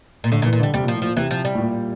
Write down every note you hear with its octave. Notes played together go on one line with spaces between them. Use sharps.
A#2
A2 D3
A#2
E3
A#2
D3 G3
C3 G3
A#2 F3
A2
A#2 F3
C3 E3
F3
G3
A2
A#2